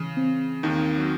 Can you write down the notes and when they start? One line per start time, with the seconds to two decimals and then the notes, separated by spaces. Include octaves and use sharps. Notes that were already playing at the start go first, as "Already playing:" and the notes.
Already playing: C#3 E3
0.17 C4
0.63 D#2 D#3 D#4
0.98 F#3